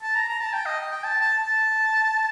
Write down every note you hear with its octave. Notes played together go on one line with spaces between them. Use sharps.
A5
A#5
A#5
A5
G5
D#5
G5
A5
A5
A5